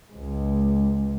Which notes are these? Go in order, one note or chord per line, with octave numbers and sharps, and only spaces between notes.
C#2 G#3